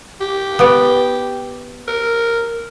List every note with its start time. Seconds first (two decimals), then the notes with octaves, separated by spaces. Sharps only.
0.21 G4
0.59 B3 D5
1.88 A#4